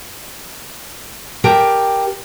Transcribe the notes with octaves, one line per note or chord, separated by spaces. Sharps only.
G4 A#4 G5 A5